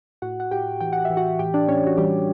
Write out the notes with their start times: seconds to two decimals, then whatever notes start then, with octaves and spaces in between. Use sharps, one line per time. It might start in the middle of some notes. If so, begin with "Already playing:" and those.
0.22 A2 F#4 F#5
0.40 F#5
0.51 A2 G4 G5
0.81 E3 G5
0.93 F#5
1.05 E3 E5
1.17 F#4 F#5
1.39 A2 G4 G5
1.54 D4 D5
1.68 A2 C#4 C#5
1.87 F#4
1.97 E3 G3 G4